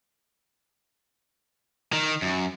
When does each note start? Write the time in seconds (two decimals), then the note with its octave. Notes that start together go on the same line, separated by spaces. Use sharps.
1.93 D#3
2.22 F#2